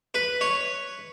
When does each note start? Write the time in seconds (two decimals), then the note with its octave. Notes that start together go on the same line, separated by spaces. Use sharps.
0.14 B4
0.41 C#5